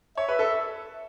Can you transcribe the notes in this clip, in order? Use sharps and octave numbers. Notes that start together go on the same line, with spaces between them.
C#5 E5
B4
A4